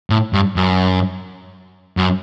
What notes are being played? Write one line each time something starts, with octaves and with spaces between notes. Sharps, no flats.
A2
G2
F#2
F#2